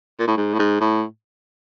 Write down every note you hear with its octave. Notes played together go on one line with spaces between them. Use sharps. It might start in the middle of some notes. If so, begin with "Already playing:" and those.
A#2
A2
G#2
A2
G#2
A2